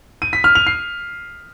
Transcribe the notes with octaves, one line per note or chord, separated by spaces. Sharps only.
D#7
B6
F6
F7
C7